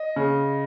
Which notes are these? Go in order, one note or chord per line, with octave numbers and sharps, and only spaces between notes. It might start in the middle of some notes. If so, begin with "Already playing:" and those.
Already playing: D#5
C#3